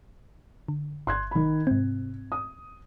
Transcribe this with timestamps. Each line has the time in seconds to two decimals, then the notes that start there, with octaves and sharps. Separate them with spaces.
0.68 D3
1.07 G1 C6 F#6 G#6
1.31 D#3 B5
1.67 G#2 C3 C4
2.32 D#6